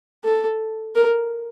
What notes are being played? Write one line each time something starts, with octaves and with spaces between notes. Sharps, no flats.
A4
A#4